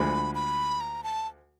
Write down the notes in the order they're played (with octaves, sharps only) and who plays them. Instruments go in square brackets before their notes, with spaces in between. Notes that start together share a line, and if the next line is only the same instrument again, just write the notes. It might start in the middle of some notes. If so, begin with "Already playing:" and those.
Already playing: [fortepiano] D2 D3 F3 G#3 [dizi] B5
[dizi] B5
A#5
A5